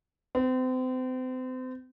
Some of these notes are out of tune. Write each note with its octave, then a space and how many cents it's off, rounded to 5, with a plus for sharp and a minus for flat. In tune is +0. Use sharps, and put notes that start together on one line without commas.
C4 -35